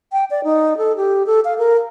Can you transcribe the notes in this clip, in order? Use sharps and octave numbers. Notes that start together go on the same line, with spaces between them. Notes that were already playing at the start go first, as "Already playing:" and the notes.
G5
D5
D#4
A4
G4
A4
F5
A#4